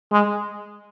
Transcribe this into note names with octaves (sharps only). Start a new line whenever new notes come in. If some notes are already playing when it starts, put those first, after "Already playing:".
G#3